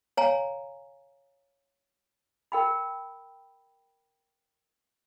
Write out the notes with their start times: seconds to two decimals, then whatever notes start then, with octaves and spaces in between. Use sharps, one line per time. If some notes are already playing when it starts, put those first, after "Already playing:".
0.17 C#5 F5 G#5 A#5
2.52 A#4 G5 B5